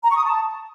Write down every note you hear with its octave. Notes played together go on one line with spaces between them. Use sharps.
A#5
C#6
D#6
A5